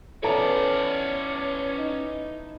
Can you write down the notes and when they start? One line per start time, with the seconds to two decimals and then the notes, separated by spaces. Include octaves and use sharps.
0.23 E3 B3 C#4 A4 C#5 D5 A5
1.78 D#4